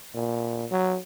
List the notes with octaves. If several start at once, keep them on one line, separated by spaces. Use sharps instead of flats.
A#2
F#3